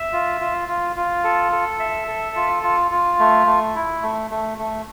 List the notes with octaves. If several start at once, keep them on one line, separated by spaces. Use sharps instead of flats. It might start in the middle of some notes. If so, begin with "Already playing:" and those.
Already playing: E5
F4
F4
F4
F4
A4
A4
E5
A4
F4
F4
F4
A3
A3
E4
A3
A3
A3